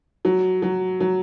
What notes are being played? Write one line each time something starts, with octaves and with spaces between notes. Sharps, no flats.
F#3
F#3
F#3